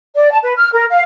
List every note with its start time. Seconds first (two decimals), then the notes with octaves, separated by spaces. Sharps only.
0.15 D5
0.30 A5
0.43 B4
0.58 F6
0.73 A#4
0.90 F5